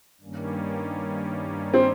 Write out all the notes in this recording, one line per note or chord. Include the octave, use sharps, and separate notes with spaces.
G2 D#3 G3 A#3 C#4
C4